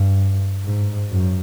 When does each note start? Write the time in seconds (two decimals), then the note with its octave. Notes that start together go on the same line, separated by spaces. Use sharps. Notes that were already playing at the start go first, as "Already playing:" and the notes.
Already playing: G2
0.63 G#2
1.10 F#2